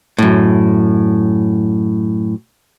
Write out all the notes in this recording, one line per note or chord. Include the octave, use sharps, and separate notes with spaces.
F#2 A2